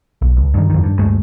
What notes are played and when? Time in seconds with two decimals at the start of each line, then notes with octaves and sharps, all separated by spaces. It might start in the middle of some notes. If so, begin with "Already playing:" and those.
0.22 B1
0.37 C#2
0.54 G2 D#3
0.70 F2 D#3
0.84 G2
0.99 D2 G2 G#3 A3